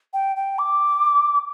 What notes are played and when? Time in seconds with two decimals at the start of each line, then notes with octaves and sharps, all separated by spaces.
0.14 G5
0.36 G5
0.59 D6